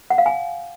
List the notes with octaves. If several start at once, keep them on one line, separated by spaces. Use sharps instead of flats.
F#5
F5
G#5